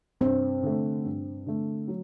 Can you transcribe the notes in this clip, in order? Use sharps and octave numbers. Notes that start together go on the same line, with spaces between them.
G2 C4
D3 A3
G2
D3 A3
F#3